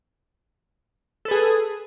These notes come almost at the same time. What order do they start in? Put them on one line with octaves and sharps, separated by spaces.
A4 B4 G#4